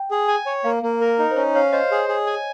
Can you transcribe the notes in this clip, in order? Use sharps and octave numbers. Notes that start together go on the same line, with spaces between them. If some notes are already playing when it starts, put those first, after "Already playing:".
Already playing: G5
G#4
G#5
C#5
A#3 F5
A#3
A#4
D#4
C5
C#4 C#5
C#5 F5
C5 D#5
G#4
G#4
G#5